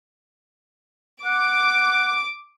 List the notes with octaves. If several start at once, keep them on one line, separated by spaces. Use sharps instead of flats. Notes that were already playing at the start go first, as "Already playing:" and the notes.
F#5 D6